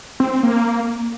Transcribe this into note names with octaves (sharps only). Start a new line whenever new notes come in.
C4
C4
A#3